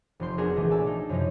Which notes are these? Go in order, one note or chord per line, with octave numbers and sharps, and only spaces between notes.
F1 F3 C4 C6 G6
B3 D4 F#4 G#4 A#4
A#1 E3 A3
D5 G#5 A5 E6
D#4
F#2 C3 F3 C#4 D#4